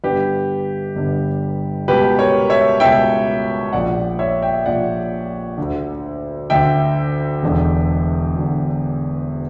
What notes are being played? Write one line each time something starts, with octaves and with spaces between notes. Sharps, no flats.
G1 G2 D3 G4 B4
G1 G2 D3
C#2 B2 G4 B4
A#4 C#5
C#5 E5
C#2 B2 E5 G5
A#1 A#2 D5 F#5
C#5 E5
E5 G5
A#1 A#2 D5 F#5
D2 D3
D2 D3 E5 G5
E1 E2 D3
E1 D3